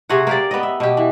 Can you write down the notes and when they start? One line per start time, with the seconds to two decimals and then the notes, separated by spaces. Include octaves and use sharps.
0.09 C3 F#4 G#4 F#5
0.27 A#3 G4 D5
0.51 B3 D#5
0.63 E5
0.80 B2 G4
0.97 E3